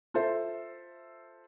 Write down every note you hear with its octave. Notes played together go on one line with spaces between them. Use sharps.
F4 A4 C5 E5